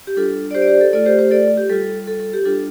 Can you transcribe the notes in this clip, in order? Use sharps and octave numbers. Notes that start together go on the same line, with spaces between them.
G4
G3 D4 F4 A4
D5
G4 C5
D5
G4 C5
A4
A3 F4 A4 D5
G4 C5
G4 C5
A4 D5
G4
G3 F4 A4
A4
A4
G4
G3 D4 F4 A4